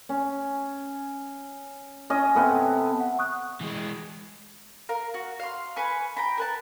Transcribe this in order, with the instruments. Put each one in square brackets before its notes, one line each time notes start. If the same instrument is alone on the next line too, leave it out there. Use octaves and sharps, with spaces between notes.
[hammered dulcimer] C#4
C#4 D#5
C3 B3 A4
[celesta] F#5
C#6 D#6 F#6
[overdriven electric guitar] E3 G#3
[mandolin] A#4 F5
F#4
F5 C6
B4 G#5 B5 C#6
G5 A#5 B5
A#4 B4 A5